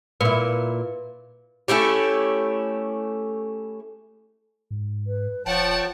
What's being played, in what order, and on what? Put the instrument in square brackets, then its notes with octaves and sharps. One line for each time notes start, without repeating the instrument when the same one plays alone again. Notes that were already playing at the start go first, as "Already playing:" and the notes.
[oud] A#2 E4 [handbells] B4
[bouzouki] A3 C#4 E4 G4
[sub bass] G#2
[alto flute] B4
[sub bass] D#1 [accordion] F3 G5 A5 [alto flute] C#5 [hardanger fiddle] F#5 C#6